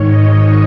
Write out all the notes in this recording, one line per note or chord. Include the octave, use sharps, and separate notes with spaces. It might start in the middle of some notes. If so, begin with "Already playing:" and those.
Already playing: G#2 D#3 C#5
D#5